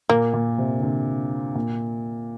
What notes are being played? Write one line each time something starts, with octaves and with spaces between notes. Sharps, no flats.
A#2 A#3
A#2
C3
D3
C3
A#2